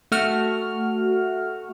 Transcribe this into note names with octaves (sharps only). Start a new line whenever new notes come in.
A3 F#4 F6